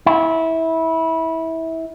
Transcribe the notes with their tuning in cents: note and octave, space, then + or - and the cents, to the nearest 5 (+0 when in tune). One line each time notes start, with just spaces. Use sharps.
E4 -20